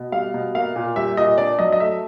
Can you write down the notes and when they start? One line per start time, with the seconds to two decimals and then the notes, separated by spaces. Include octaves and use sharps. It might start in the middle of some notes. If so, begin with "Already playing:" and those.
Already playing: B2
0.12 G3 F5
0.34 B2
0.55 A#3 F5
0.76 A#2
0.96 G3 E5
1.17 A#2 D#5
1.38 D4 D5
1.59 F#3 D#5
1.72 D#5
1.80 A3 E5